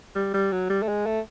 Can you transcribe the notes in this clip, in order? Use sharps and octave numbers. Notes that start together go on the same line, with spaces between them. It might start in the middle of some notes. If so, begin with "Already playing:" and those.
G3
G3
F#3
G3
A3
G#3
A3